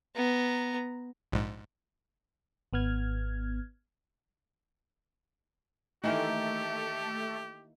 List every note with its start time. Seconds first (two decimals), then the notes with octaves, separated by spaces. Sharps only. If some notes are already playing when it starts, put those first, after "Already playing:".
0.15 B3 A#5
1.32 A#1 G#2
2.73 G#1 B3 F6 G#6
6.04 D#3 E3 A3 A#3 G4